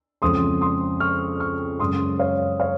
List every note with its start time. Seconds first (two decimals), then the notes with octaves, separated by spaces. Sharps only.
0.22 F2 C#3 G#3 C6 D#6
0.61 C6 D#6
1.00 C#6 F6
1.40 C#6 F6
1.80 F#2 C#3 G#3 C6 D#6
2.19 C#5 F5
2.60 C#5 F5